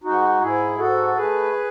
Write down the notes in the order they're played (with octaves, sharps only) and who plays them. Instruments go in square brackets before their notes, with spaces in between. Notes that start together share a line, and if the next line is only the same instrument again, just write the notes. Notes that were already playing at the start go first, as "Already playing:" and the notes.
[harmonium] G#2 D#4 F#4
G#2 E4 G#4
G#2 F#4 A4
A3 G#4 B4